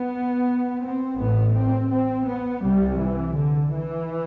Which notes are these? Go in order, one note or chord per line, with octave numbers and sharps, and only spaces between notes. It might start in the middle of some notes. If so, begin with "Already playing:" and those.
Already playing: B3
C4
A1 A2 B3
C4
C4
B3
C2 C3 G3
E3
D3
E3